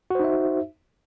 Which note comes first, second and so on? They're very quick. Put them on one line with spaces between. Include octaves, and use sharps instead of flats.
F#4 C5 D#4 E5